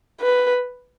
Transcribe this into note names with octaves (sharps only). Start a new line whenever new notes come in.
B4